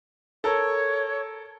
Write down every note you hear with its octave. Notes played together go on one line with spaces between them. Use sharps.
A4 A#4 C#5